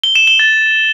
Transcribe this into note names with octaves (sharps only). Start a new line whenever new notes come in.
G7
E7
G7
A6